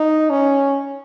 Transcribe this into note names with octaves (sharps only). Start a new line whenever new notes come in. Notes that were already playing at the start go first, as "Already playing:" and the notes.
Already playing: D#4
C#4